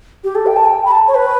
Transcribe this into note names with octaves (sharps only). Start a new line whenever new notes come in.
G4
A4
G5
A5
G5
B5
A5
C#5
B4